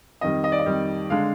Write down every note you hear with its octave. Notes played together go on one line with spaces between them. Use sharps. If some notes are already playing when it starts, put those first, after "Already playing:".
F2 D#3 G3 D#5
D#5
D5
D#5
F2 D#3 G3
D3 G#3 D4 F5